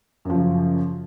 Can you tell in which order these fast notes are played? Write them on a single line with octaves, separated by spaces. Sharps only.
F#2 F3 C#3